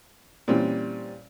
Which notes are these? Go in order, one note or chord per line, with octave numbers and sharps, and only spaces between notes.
A#2 E3 G3 C4 C#4